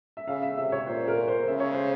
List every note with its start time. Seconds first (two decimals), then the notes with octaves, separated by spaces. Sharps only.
0.17 E5
0.28 C#3 F5
0.43 E5
0.58 C3 E5
0.72 C#5
0.87 A#2 C5
1.08 A#4
1.28 C5
1.47 C#3 E5
1.60 C#5
1.73 C5